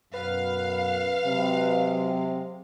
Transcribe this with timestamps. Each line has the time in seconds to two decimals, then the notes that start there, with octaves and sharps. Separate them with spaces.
0.13 F#2 B2 B4 F5 F#5
1.25 C3 F#3 G#3